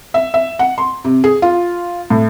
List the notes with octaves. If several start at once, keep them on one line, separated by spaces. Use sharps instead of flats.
E5
E5
F#5
C6
C3
G#4
F4
A2